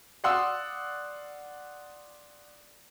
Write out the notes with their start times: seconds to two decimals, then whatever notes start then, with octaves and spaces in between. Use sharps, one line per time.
0.24 D5 F5 F#5 C6 D#6 E6